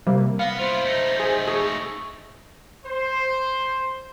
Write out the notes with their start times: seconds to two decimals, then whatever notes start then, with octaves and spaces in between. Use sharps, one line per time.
0.07 C3 G3 A#3
0.39 B3 F5 A#6
0.58 E4 F4 C5
0.84 A3 D#4
1.20 G#4
1.47 G#4 C#6
2.86 C5